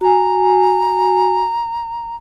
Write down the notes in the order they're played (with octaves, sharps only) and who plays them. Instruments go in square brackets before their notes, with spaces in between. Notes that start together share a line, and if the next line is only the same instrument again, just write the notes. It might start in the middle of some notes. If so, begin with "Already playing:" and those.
[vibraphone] F#4 G#5 [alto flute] A#5